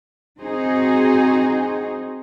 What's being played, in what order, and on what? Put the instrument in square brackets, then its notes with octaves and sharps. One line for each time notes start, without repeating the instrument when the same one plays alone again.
[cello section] C4 D#4 F#4 G#4 C5